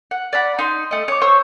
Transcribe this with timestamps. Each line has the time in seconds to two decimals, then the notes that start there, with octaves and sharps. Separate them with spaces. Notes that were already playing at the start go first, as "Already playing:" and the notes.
0.11 F#5
0.33 D5 F#5 B5
0.59 D#4 C6
0.91 A3 D#5
1.08 C#5 D6
1.22 C5 C#5 C#6 E6